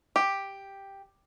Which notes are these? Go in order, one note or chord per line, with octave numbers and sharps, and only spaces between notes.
G4